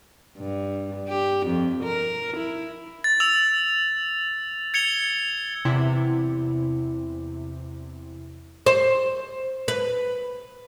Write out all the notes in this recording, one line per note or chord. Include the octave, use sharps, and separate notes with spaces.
G2
G4
F2
A#4
E4
A6
E6 F7
G#6 C#7 F7 G7
E2 C3 E4
C5
B4